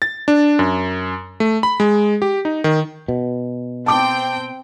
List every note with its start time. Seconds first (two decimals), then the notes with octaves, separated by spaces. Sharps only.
0.02 A6
0.28 D4
0.59 F#2
1.40 A3
1.63 B5
1.80 G#3
2.22 G4
2.45 D#4
2.64 D#3
3.08 B2
3.86 C4 G5 A5 D6